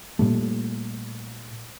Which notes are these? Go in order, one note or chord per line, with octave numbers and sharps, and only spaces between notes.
A#2 G3 A3